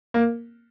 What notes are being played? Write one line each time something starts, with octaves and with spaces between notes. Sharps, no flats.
A#3